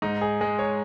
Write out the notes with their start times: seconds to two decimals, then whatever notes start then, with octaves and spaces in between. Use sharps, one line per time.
0.02 G#2 D#4
0.21 G#4
0.41 G#3
0.59 C#5